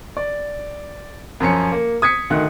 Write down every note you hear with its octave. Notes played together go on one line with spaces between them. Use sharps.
D5
F#2 F3 C#4 C#7
A#3
D#6 G#6 B6 C#7
D2 D#3 F#6